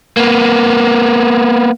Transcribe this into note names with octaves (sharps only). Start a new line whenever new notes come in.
A#3 B3